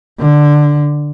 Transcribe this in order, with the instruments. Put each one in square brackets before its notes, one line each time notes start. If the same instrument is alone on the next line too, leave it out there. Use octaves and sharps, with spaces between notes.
[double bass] D3